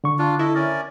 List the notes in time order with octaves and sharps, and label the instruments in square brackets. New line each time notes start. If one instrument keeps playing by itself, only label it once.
[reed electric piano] D3 C#6
[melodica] D4 F4
[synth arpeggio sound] E4 [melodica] A4 D#5
[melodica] C#4 A#4 D5